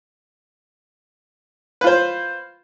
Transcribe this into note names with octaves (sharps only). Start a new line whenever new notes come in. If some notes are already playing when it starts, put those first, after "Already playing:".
F4 B4 C5